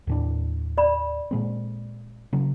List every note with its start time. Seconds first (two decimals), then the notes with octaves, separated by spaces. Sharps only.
0.07 D#2 A2 D4
0.78 D5 B5
1.31 A#2 G#3 C4
2.33 C#3 F#3